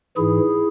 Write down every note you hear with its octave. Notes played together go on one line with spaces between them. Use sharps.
G#2 E3 E4 G#4